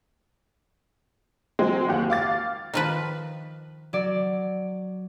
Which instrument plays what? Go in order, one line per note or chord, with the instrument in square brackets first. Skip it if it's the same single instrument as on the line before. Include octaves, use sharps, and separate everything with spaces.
[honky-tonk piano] F#3 G#3 C4
F#1 D#2 G4 F#5
F5 D6 A6
[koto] D#3 F3 B4
[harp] F#3 D5